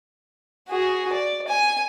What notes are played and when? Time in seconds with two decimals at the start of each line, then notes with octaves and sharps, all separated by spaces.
0.69 F#4 G#4
1.12 D5
1.48 G#5